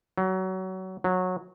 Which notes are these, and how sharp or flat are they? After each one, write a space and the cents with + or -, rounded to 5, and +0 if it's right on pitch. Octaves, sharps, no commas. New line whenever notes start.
F#3 +25
F#3 -15